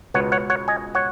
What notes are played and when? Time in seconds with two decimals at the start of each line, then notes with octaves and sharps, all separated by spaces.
0.14 C#2 B2 B3 C#5 F#5
0.32 C#5 F#5
0.50 C#5 F#5
0.68 D#5 G#5
0.95 C#5 F#5